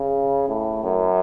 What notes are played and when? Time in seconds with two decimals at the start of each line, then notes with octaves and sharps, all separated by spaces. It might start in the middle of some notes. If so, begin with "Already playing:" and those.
Already playing: C#3
0.48 A2
0.84 F#2